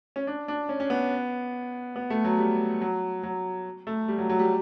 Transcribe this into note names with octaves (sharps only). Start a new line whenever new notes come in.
C#4
D4
D4
C#4
C#4
B3
B3
A3
F#3
G3
F#3
F#3
A3
G3
F#3
F#3
G3